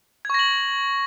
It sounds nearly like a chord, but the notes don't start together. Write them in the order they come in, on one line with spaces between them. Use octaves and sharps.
G#6 C#6 A#6 F#7